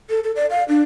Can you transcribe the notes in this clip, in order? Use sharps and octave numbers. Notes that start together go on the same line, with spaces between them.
A4
A4
D5
F5
D4